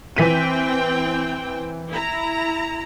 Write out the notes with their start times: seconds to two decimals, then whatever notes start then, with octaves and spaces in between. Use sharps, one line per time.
0.16 E3 C4 G5 B6 D#7
1.90 E4 A#5